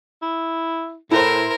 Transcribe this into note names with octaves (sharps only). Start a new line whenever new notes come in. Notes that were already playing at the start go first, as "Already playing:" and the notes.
E4
A2 E4 A#4 C5